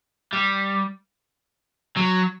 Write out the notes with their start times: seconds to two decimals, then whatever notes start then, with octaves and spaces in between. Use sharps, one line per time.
0.33 G3
1.97 F#3